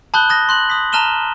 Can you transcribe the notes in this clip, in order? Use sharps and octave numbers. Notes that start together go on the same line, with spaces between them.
A5 B5 D#6 F#6 G6 G7
D#6 A6 A#6
C6 F#6 F#7
D#6 B6
A5 A#5 F6 D#7 E7 G7